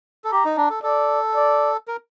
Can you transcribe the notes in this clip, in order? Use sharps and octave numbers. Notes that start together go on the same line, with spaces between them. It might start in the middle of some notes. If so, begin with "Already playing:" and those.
A4
G4 A#5
D#4
D4
A4
A4 D5
D5
A#4